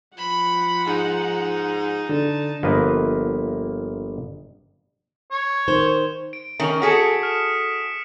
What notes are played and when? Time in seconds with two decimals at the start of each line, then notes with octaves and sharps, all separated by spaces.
0.17 F3 F#5 B5
0.87 G#2 D#4
2.09 D3 A5
2.63 G1 F3 A#3 B4 D#5
5.31 C#5
5.68 D#3 C5
6.33 D7
6.60 D#3 C#4
6.82 F#4 G#4 A4 D#6 B6 C#7
7.23 F6 E7